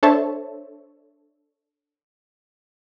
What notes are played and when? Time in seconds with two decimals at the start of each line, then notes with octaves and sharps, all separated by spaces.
0.03 D4 A4 C5 C#5 E5 A5